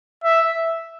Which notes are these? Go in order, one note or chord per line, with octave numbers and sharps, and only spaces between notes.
E5